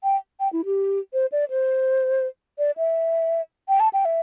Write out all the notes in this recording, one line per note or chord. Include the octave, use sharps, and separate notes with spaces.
G5
G5
E4
G4
C5
D5
C5
D5
E5
G5
A5
G5
E5